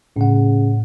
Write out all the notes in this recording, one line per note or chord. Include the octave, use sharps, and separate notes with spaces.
A2 C#3 F#5